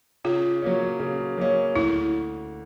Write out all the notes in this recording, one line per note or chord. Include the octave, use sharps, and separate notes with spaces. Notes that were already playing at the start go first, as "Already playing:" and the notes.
C#3 F4
F#3 A#3 C#4
C#3
F#3 A#3 C#4
D2 E4